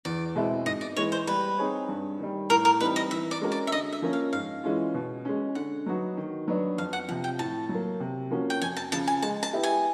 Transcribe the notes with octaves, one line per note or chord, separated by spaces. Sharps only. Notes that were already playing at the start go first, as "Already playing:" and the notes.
E2 D5
B2 G#3 C4 E4
G#2 D#5
D5
E3 G#3 B3 C#5
C5
G3 B4
C4 D#4 G#4 C#5
G2
D#3 G3
A2 A#4
A#4
E3 G3 C4 D#4 B4
D#5
E3 E5
D5
G#3 C#4 F#4 A#4
D5
E5
D3 D#5
E5
F3 A#3 C#4
F5
G#2 F5
E3 G#3 C#4 F4
B2
G#3 C#4
D3 F#5
F#3 B3 D#4 F#4
D#3
F#3 B3 D4
F2 F5
F#5
C3 F3 F#5
G5
A2 A5
F#3
A#3
C3
F3 A#3 C#4 F#4
G5
F2 G#5
A5
C#3 F3 A5
G#5
G#3 A5
A5
B3 E4 G4
G#5